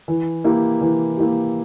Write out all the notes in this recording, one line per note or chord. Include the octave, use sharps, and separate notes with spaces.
E3
A#3 E4 G4
E3
A#3 E4 G4